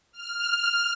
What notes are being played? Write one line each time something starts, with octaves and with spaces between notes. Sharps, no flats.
F6